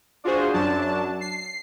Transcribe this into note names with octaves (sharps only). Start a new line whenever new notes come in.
D4 F4 F#4 G#4 C5
F#2 F#3 D4 A5
C7